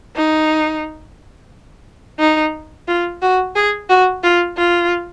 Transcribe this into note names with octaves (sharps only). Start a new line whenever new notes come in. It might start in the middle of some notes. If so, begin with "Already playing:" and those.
D#4
D#4
F4
F#4
G#4
F#4
F4
F4